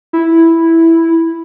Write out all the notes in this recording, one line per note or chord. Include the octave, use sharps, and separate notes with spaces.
E4